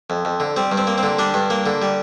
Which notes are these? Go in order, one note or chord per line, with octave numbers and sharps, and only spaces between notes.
F2
F2
D3
G3 C4
G2
C4
A#3
C4
D3
G3 D4
G2
A#3
D3
G3